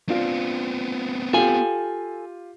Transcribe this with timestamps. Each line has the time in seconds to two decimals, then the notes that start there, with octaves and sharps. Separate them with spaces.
0.09 B3 C4 D4 F4
1.33 F4 G4 A4 G#5